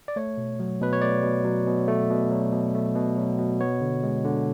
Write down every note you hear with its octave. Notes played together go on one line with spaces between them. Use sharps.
D5
A3 C#5
B2
F#3
B2 B4
C#5
A3 D5
B2
F#3
B2
A3
B2
F#3
B2
A3
B2
F#3
B2
B3 C#5
D3
G#3
D3